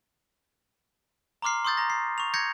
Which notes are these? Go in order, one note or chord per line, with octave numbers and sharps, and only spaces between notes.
A#5 C6 D6 F6 C7
C6 C#6 D#6 G6 A6
A#5 A#6
C7
C#6 F7
G6 G#6 A#6 C#7